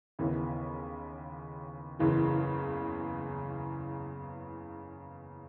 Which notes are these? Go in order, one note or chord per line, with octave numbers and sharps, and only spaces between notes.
D#2 C#3 E3 B3
F#1 E2 C#3 E3